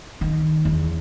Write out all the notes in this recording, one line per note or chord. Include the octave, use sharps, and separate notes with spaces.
D#3
E2